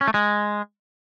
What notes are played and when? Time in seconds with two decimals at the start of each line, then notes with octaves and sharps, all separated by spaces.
0.01 C#4
0.08 A3
0.14 G#3